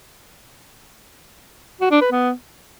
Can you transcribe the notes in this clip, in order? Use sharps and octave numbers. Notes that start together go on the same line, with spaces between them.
F#4
D4
B4
B3